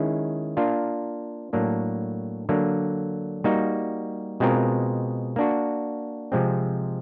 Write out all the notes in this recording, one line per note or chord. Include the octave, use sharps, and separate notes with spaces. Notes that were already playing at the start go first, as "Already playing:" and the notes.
Already playing: D#3 G#3 C#4 E4 G#4
A#3 D4 F4
A2 F#3 A#3 D4
D3 F#3 A#3 D4
G3 A#3 D#4 F#4
B2 G#3 C4 F4 A#4
A#3 D4 F#4
C3 F3 G#3 C4